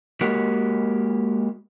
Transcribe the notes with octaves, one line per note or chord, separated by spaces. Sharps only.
G#3 A#3 F#4 G4 A#4